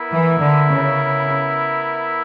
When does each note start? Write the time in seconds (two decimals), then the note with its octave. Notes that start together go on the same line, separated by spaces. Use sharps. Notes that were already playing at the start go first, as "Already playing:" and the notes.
Already playing: B3 E4 A#4 E5
0.11 E3
0.40 D3
0.69 C#3